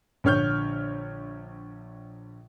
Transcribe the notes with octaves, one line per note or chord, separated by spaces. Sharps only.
A#1 D3 C#5 F6 G6